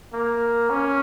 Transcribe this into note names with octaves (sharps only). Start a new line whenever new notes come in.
A#3
C#4